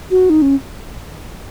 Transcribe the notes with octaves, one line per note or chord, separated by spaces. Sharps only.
F#4
D#4
C#4